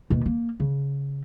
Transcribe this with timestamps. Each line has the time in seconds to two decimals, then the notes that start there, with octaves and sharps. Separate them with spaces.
0.10 D#2 B2
0.26 A#3
0.60 C#3